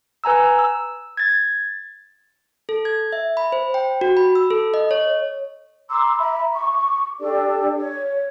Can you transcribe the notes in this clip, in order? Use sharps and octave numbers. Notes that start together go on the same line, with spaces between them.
B4 G#5 A#5 E6
E6
G#6 A6
A4
G#6
E5
B5
C5
G5
F#4
B5
E6
A4
D#5
C#5
A#5 C6 D6 E6
E5 A#5 B5
C#6 D6
D4 G4 A4 D5
C#5